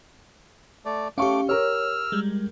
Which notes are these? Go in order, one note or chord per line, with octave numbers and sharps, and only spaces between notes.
A3 D5
A3 C#4 G4 F5 C#6 D6
G4 A#4 C#5 E6 F6
G3 G#3